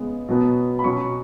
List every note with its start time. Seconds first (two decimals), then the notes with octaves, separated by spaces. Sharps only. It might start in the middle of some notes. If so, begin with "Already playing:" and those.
Already playing: C#3 G#3 B3
0.29 B2 F#3 B3
0.79 B5
0.84 B2 F#3 C#4 C#6